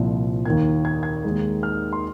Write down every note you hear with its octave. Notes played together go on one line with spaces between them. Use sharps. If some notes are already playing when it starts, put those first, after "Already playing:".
Already playing: C2 A#2 F3
D#2 D#3 A#3 G#6
G#6
G#6
D#2 D#3 G#3
F6
C6